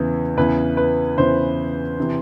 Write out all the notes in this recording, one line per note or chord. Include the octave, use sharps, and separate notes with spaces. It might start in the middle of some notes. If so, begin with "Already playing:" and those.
Already playing: E2 C#3 E3
E2 C#3 E3 B4
B4
E2 C#3 E3 C5
C3 E3